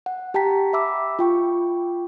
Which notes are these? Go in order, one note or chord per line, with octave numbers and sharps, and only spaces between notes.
F#5
G4 G5 A5 A#5 B6
E5 B5 D6 E6
F4 G5 C#6